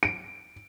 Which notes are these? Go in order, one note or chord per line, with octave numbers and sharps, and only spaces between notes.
D7